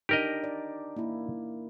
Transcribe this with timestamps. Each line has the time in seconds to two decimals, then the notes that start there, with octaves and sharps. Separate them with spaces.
0.09 D4 D#4 G4 A#4 D#5
0.44 D5
0.96 A#3 E4